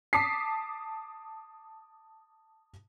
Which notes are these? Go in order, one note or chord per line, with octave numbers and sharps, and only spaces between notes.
A5 D6 D#6 B6 C7